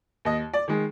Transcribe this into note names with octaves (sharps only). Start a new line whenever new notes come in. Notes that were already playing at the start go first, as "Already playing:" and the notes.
D#2 D#5
D5
D#3 G#3